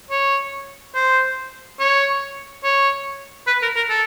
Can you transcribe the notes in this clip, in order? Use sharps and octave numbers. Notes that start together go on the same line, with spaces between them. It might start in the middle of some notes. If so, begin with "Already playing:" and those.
C#5
C5
C#5
C#5
B4
A#4
A#4
A4